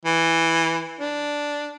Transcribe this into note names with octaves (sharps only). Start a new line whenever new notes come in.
E3
D4